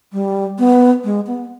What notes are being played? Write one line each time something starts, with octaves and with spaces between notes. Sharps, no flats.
G3
B3
G#3
B3